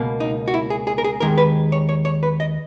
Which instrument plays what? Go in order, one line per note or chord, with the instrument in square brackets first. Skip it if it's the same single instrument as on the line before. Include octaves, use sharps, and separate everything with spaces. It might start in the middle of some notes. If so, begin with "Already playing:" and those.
Already playing: [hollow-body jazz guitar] C#2 B2 A#3
D#4
F#4
E4
G#4
G#4
A#4
G#4
D#2 D#3 G#3 A#4
B4
C#5
C#5
C#5
B4
D#5